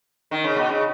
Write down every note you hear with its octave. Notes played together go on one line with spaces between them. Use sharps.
D#3
C#3
B2
C#3